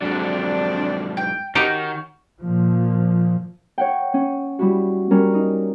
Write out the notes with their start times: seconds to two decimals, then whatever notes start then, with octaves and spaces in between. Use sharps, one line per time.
0.02 F2 G#2 F#3 D4
1.17 G5
1.55 D#3 C#4 D#4 F#4 G4
2.42 A#2 F3
3.78 C#5 F#5 G5
4.14 C#4
4.59 G3 E4 F#4
5.11 G3 C#4 A#4
5.34 D#4